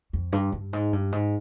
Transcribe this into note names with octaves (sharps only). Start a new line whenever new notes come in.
F2
G2
G2
G#2
G2
G#2